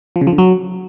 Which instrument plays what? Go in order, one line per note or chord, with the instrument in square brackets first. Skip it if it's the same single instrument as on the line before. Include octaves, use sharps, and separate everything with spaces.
[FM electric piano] F3
C#3
F3
D3
F#3